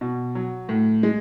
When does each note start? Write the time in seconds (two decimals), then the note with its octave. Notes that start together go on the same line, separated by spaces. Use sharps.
0.01 B2
0.35 F#3
0.69 A2
1.03 G#3